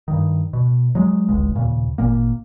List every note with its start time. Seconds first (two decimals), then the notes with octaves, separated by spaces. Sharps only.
0.08 G2 D#3
0.53 B2
0.95 F#3 G#3
1.29 D1 G#1 C#2 G#3
1.55 D#2 A#2 C#3
1.98 G#1 A#2 A#3